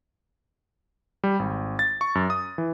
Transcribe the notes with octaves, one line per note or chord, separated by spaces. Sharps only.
G3
G#1
A6
C#6
F#2
D#6
E3